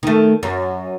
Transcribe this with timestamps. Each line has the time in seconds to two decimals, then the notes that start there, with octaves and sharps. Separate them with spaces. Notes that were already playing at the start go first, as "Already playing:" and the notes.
0.03 D#3 A3
0.43 F#2